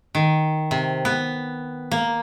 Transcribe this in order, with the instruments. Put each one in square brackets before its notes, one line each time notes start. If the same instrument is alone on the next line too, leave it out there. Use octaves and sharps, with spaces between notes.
[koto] D#3
C3
B3
A#3